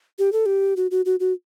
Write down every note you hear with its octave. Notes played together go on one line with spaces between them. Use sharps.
G4
A4
G4
F#4
F#4
F#4
F#4